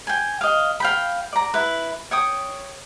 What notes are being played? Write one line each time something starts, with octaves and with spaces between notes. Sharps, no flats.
G5 G#5
D#5 F5
F5 G5 B5
D5 A#5
E4 B4
C#5 G5 D#6